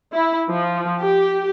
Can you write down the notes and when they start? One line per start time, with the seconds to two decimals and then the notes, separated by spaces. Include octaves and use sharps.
0.13 E4
0.48 F3
0.99 G4